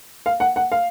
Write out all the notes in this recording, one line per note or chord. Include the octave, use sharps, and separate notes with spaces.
F5
F#5
F#5
F5